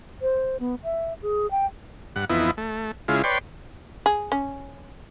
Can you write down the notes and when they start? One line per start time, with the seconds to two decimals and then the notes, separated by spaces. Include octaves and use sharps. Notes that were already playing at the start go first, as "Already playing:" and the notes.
0.22 C5
0.60 B3
0.84 E5
1.22 G#4
1.51 G5
2.16 G2 F#5
2.30 F2 E3 B3 D#4 E4
2.57 A3
3.08 C#3 G#3 E4 F4
3.24 B4 C#5 D5 G5 C6
4.06 G#4
4.32 C#4